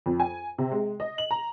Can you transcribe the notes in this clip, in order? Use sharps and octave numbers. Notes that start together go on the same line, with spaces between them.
F2
G#5
C3
G#3
D#5
F#7
A#5